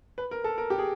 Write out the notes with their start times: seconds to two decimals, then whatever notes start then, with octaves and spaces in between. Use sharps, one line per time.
0.18 B4
0.31 A#4
0.44 A4
0.58 A#4
0.70 G4
0.78 G#4